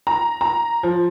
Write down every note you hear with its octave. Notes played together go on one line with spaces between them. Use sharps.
A#5
A#5
F3